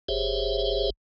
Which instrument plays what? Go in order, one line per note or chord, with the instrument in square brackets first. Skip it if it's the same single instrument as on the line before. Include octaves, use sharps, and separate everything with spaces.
[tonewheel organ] F#1 G4 G#4 C5 C#5 E5